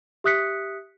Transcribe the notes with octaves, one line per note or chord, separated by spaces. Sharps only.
G4 E5 D#6 F#6 B6 C#7